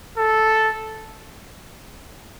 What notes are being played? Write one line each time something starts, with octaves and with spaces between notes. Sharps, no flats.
A4